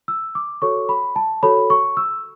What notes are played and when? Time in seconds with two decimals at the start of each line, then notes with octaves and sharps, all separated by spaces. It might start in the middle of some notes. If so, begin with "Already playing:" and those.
0.08 E6
0.35 D6
0.62 F#4 A4 C#5 C#6
0.89 B5
1.16 A5
1.43 F#4 A4 C#5 B5
1.70 C#6
1.97 E6